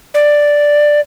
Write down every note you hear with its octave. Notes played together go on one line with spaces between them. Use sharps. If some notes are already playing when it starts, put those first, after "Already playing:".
D5